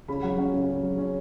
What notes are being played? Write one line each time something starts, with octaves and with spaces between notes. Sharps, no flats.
C#3 B5
F#3 F#5
C#4 F#5
C#3
C#3
F#3
C#4